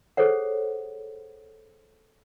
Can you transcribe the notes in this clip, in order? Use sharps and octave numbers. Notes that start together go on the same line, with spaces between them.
G#4 A4 C5 C#5 F#5